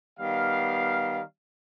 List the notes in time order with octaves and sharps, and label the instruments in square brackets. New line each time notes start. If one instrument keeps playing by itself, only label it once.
[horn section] D#3 G3 B3 F5